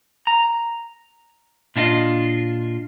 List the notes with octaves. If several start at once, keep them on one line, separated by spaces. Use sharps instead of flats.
A#5
A#2 D4 E4 F4 D#5